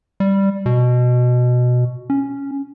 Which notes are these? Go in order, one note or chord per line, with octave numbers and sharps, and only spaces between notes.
G3
B2
C#4